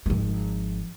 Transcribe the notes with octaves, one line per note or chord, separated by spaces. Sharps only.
G#1 F3